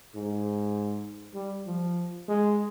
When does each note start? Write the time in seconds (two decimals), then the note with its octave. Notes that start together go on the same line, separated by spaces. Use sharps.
0.15 G#2
1.34 G3
1.66 F3
2.29 G#3